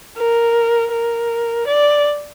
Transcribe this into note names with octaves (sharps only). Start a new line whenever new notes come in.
A#4
A#4
D5